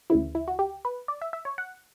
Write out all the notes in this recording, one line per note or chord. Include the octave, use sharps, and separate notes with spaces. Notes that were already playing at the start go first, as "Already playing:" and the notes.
D2 C#3 E3 E4
E4
F#4
G4
B4
D5
E5
E5
C#5
F#5